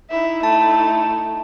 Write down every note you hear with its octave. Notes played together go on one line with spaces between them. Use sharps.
D#4 E4 E5
A3 A5